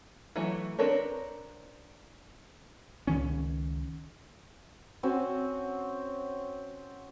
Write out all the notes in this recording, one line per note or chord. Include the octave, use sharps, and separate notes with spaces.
E3 F#3 A3 E4
C4 D4 A#4 B4 C#5
C#2 D#3 C#4
C4 C#4 F#4